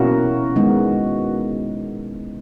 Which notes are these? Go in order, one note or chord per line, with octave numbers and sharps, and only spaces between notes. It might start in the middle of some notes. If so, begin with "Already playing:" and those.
Already playing: B2 A#3 C#4 E4 F#4 A#4
D#3 G#3 B3 D#4